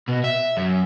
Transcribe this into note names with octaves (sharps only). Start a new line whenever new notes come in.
B2
E5
F#2